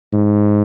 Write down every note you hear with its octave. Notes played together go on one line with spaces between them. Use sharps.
G#2